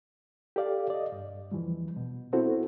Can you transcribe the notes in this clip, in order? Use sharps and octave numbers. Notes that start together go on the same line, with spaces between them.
G4 A4 D5 F5
D5 D#5
G2
E2 E3 F3 G3
B2
B3 C4 E4 F#4 A4 C5